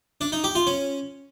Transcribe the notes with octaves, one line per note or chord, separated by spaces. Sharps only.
D4
D#4
G4
F4
C#4